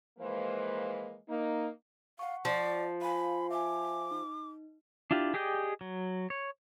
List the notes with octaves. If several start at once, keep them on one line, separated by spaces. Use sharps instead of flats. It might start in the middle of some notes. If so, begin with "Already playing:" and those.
E3 F3 G#3 A#3 B4 C5
A#3 D#4
F5 F#5 C#6
F3 D5
F5 G#5 B5
E5 G#5 D6
D#4
D4 E4 F4 G4
G4 G#4 D5 D#5 G5
F#3
C#5